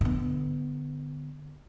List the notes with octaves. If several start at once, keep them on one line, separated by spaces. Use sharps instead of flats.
D3 B3